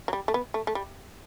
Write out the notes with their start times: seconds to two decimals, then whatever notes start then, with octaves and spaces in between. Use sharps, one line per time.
0.08 F#3
0.13 G3
0.28 A3
0.34 B3
0.54 A3
0.67 A3
0.75 G3